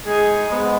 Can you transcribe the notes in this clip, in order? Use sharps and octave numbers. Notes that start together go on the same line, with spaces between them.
G#3 D#4 G#4
G#2 G#3 B3